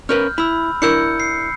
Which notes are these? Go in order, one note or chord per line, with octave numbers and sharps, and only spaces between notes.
C#4 A#4 B4 F6 G6
E4 B5 E6
D4 E4 A#4 E6 G6 C#7
C7